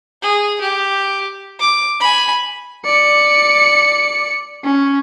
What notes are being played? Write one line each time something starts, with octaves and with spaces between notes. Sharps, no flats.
G#4
G4
D6
G#5 B5
D5 C#7
C#4